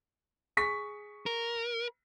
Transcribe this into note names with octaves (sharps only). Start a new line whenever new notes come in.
G#4 C#6 B6
A#4